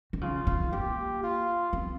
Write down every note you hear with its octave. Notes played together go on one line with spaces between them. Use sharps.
D#3
C#3 F4
D#3
A#3 G4
F4
C4